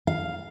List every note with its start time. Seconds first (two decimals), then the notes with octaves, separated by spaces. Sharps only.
0.07 F5